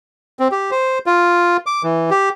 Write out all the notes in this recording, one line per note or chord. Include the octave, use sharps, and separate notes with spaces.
C4
G4
C5
F4
D6
E3
G4